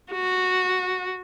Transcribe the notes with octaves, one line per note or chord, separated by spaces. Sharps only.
F#4